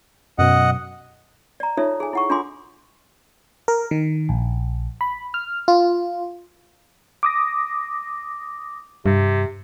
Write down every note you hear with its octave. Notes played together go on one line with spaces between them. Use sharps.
F#2 B2 D#5 F#5
D5 A#5
D#4 F4 A4 C#5 E5
G#4 G#5
E4 F#5 C#6
D4 F4 A4 G#5 C6 D6
A#4
D#3
A#1
B5
F6
F4
D6 D#6 A#6
G2 C3